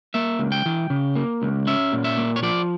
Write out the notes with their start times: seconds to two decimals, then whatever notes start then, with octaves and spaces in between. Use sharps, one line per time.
0.14 A#3 E5
0.39 C#2
0.52 G5
0.66 E3
0.90 C#3
1.16 A#3
1.42 C#2
1.67 C#4 E5
1.93 A#2
2.04 E5
2.17 A#3
2.36 C#5
2.42 F3 D5